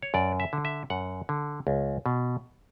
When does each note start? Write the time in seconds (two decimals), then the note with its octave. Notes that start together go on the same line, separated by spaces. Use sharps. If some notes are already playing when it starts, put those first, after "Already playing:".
0.03 C#5
0.14 F#2 D5
0.40 E5
0.53 D3
0.65 E5
0.90 F#2 F#5
1.29 D3
1.67 C#2
2.06 B2